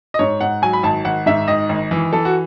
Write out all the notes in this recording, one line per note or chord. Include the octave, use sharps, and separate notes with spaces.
D#5
G#2 C#5
G#2 F#5
F#3 G#5
B5
G#1 A5
G#1 F#5
G#2 E5
G#1 D#5
G#1
E3
E3 A4
F#4